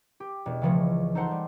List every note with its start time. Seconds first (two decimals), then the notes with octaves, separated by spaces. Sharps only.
0.20 G4
0.46 E1
0.61 C#2 C#3 E3 F3 G#3 A3
1.15 D#4 A4 C5 F#5 A5 C6
1.31 G3